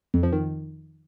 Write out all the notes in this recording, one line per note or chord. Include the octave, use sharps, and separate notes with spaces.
F2
F3
D#3